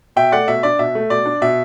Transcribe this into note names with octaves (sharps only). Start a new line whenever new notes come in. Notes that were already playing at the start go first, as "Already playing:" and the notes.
B2 E5 G5
A3 D5 F#5
B2 E5
D4 D5
B2 E5
A3
B2 D5
D4
B2 E5